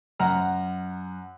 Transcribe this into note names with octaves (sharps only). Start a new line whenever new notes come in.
F#2 F#5 A#5 F6